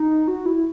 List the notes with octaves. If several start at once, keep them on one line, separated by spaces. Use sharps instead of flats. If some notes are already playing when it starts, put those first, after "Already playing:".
Already playing: D#4
F#4
E4